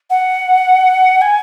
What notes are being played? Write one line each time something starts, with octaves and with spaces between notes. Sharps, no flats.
F#5
G#5